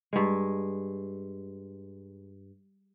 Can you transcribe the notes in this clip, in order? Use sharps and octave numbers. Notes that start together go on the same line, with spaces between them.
G2 G#3